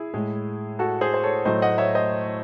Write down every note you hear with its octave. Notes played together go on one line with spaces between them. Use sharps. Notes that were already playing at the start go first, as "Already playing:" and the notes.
Already playing: E4 G#4
A2 G#3
F#4 A4
G#4 C5
C5
A4 C#5
A2 F#3 A3 C5 D#5
D#5 F#5
C#5 E5
C5 D#5